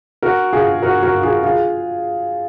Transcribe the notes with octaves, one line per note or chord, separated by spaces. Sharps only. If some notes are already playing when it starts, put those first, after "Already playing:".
F#4 A#4
F4 G#4
F#4 A#4
F#4 A#4
F4 G#4
F4 G#4